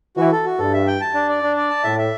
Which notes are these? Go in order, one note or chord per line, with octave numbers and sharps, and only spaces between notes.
E3 F#4
A4
F#4
G2 A4
E5
G5
A5
D4
D5
D4
D5
A5
A2 E5
E5